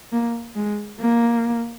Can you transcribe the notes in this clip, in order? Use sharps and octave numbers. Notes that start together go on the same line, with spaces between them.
A#3
G#3
A#3